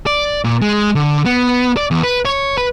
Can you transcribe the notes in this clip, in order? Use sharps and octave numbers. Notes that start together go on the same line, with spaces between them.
D5
A#2
G#3
D3
B3
D5
E2
B4
C#5
B4